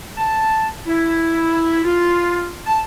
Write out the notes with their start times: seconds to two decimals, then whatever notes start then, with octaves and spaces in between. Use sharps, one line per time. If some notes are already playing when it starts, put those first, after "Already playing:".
0.17 A5
0.87 E4
1.84 F4
2.66 A5